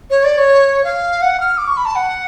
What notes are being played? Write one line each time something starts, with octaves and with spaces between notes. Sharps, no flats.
C#5
D5
C#5
F5
F#5
F6
D6
C#6
B5
A5
F#5